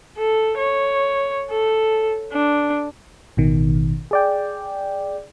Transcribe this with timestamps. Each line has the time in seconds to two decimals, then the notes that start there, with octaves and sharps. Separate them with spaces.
0.18 A4
0.57 C#5
1.51 A4
2.32 D4
3.37 A1 B2 D#3
4.11 G#4 D5 G5